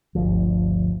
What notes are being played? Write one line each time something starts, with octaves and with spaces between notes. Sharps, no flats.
G1 D2 F3